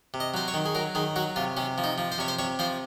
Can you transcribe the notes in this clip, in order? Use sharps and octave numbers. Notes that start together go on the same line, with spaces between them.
C3
D#5
F#3 C5
C#5
D#3
G#4
F#3 A#4
D#3 G#4
F#3 F#4
C3 F4
C3 C#4
F3
D#4
F3
C5
C3 C#5
C5
C3 C#5
F3 C5